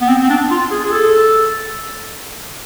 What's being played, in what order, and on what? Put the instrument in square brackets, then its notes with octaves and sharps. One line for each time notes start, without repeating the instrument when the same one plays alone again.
[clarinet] B3
C4
C4
D4
F4
G#4
G#4
A4